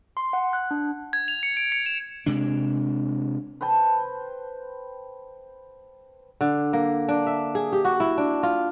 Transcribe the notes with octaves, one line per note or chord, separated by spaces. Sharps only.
C6
F#5
F#6
D4
G#6
F7
C#7
D7
C#7
E7
C3 G#3 D4
B4 C5 G5 A5
D3
A#3
D4
E5
G#4
G4
F#4
E4
D4
F4